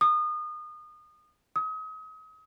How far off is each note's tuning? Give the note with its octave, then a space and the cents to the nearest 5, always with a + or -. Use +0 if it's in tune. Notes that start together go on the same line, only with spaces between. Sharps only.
D#6 -30
D#6 +35